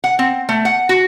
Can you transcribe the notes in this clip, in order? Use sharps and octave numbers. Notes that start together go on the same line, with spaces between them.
F#5
C4
A3
F#5
F#4